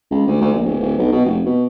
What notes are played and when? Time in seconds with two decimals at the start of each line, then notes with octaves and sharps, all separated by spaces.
0.11 C#2
0.27 D2
0.41 D2
0.53 A#1
0.65 D1
0.80 D1
0.98 B1
1.12 B2
1.25 F1
1.46 B2